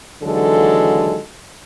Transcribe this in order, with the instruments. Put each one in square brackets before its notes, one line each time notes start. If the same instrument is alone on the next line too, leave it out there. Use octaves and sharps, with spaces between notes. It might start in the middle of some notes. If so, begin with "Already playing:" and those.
[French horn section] D#2 D3 E3 F#3 G#3 A4